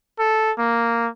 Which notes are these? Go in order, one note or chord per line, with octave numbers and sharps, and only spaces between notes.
A4
A#3